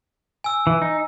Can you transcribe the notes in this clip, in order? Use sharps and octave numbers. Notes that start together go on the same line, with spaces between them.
G#5 E6
E3
D#4